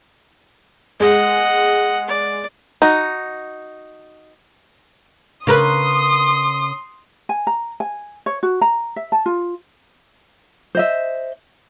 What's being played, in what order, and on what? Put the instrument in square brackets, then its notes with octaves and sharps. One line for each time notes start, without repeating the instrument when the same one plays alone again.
[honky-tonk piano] G#3 [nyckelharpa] D#5 F#5
[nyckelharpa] D5
[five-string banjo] D#4 F#4
[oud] C#3 A#4 B4 [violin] C6 D#6
[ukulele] G#5
A#5
G#5
C#5
F#4
A#5
E5
A5
F4
C5 D#5 E5